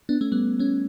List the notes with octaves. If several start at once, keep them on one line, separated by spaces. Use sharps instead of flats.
B3 D4
A3 C#4
G3 B3
A3 C#4